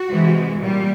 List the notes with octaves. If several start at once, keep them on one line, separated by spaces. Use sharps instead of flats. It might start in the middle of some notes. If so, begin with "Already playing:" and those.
Already playing: F#4
C3 E3 G#3
A#2 G3